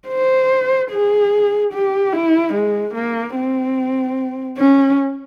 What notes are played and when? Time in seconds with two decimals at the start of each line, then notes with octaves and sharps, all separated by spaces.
0.08 C5
0.91 G#4
1.73 G4
2.13 E4
2.54 G#3
2.94 A#3
3.36 C4
4.58 C#4